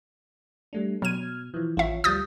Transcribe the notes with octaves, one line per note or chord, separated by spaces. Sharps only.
G3 A3 D4
B2 F#3 F6 G#6 D#7
E3 F3
A1 F4 C#5 E5
D2 F3 G3 D#6 G6 A6